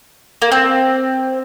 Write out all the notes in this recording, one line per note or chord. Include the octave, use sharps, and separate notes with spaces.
A#3
C4